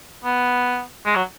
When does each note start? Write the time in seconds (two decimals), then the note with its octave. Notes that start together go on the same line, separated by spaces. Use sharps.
0.24 B3
1.06 G#3
1.16 F#3